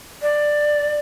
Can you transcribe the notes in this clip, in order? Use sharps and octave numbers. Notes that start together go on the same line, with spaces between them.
D5